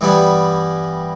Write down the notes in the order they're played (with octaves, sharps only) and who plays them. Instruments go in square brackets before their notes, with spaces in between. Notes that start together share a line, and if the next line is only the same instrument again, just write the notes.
[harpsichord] G2 E3 G3 B3